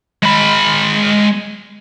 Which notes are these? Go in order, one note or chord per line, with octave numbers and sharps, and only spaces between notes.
G#3 B5